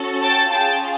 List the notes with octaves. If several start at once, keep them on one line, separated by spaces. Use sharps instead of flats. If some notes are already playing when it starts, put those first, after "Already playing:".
Already playing: C#4 F#4 A4
G5 A5
C#4 F4 G#4 G5 A5